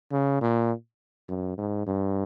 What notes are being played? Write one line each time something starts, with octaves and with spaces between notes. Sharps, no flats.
C#3
A#2
F#2
G#2
G2